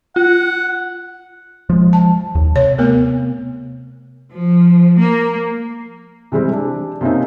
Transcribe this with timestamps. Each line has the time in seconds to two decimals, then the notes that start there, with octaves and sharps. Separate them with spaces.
0.16 F4 F#5
1.70 F3 G#3
1.93 A5
2.35 D#2
2.56 C3 C#5
2.78 A3 B3 A#4
4.32 F3
4.99 A#3
6.32 C3 E3 G3 G#3 C4
6.52 D4
7.01 C3 A#3 C4 C#4 D#4